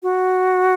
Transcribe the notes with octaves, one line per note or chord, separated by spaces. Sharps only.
F#4